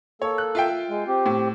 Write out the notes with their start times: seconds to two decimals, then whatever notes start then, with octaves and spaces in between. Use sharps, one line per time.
0.22 A#3 A4 C#5
0.38 F#6
0.55 F4 E5 G5
0.89 G#3
1.08 C4 G4
1.26 A2